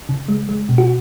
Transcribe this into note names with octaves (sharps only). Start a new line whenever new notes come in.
C#3
G#3
G#3
B2
F#4